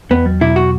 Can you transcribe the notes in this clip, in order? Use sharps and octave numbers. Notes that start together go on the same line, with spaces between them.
E2 B3
F#3
B2 E4
F#4